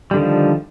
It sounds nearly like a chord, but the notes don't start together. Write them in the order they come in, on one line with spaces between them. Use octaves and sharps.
G3 D3 D#3 F3